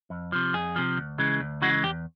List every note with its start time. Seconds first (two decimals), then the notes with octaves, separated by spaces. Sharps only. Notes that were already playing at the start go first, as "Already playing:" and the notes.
0.10 F2
0.32 C3 F3
0.54 F2 G#4
0.76 C3 F3
0.97 D2
1.18 C#3 E3 G#3
1.40 D2
1.62 C#3 E3 G#3 F#4
1.83 E2 G4